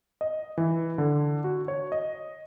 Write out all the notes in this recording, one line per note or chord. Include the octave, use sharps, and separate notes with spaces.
D#5
E3
D3
F#4
C#5
D#5